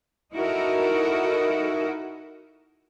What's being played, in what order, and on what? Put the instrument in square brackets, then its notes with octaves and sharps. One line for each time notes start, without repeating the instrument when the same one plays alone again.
[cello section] D#4 E4 F#4 A4 A#4 D#5